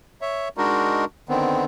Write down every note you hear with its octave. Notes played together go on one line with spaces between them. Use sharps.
C#5 E5
G#3 D4 D#4 F#4 A#4
D3 D#3 B3 C4